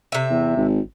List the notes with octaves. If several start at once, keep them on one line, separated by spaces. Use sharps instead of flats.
C3 E5
E2
G#1